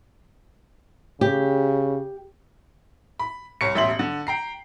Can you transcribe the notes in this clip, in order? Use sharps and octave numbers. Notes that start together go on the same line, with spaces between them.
C#3 G4
B5
C2 C#5 C#7
E1 A1 E5 C6 F#7
D3
G5 A#5 C7